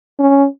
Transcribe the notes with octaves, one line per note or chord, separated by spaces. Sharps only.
C#4